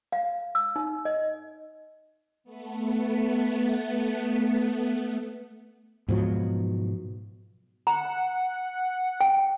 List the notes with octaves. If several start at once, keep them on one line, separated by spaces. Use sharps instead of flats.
F5
E6
D#4
D#5
A3 B3
G#2 B2 F3 F#3
F#5 A#5
G5